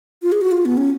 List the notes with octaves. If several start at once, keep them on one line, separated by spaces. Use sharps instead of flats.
F4
G#4
F#4
F4
B3
C#4